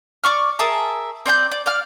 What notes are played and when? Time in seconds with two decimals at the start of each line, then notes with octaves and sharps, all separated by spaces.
0.24 D5 C#6 F6
0.59 G#4 A#4 E5 A5
1.26 C4 D5 G#5 G6
1.51 D5
1.66 D5 F5 F6